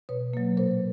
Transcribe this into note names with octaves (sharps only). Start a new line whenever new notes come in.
B2 B4 C#5
F#3 A#3
A#2 A#4 C5